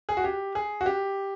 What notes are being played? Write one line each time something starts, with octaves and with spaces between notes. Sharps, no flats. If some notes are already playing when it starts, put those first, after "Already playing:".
G#4
F#4
G4
G#4
F#4
G4